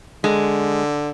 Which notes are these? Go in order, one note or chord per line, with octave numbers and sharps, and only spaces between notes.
D3 G#3